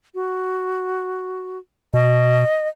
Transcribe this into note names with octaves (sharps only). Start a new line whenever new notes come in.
F#4
B2 D#5